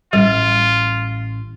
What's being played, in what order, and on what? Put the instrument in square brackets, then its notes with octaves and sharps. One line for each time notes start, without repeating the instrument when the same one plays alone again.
[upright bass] A1 [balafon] G3 [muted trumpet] F4